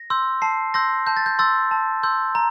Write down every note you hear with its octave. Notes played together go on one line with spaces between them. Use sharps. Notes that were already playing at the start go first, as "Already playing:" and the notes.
Already playing: A#6
C6 E6 G6
A5 C7
C6 E6 G6 A#6
A5 G6
A6
G6
C6 E6 G6 A6
A5
C6 E6 G6
A#5